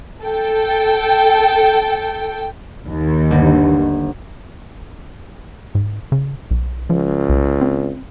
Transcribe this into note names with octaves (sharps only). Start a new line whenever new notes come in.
A4 G5
D#2
G1
G#2
C#3
B1
C#2 F3
C2
C4